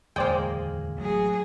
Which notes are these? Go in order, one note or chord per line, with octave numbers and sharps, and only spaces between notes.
D1 E2 D#3 G#3 A#3 C5 D5 G5
A1 F#3 A3 G#4